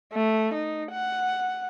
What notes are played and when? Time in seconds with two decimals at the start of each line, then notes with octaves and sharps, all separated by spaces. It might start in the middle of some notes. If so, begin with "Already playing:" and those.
0.13 A3
0.54 D#4
0.93 F#5